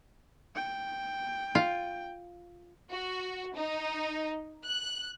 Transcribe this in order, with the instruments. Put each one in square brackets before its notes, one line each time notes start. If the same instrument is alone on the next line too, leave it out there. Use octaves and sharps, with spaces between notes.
[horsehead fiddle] G5
[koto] F4
[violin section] F#4
D#4
F#6